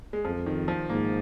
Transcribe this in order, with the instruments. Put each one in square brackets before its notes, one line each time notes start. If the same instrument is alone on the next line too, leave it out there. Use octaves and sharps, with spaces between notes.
[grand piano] G#3
[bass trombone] F2 [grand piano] F3
[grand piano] D#3
F3
[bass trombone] G#2 [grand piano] A#3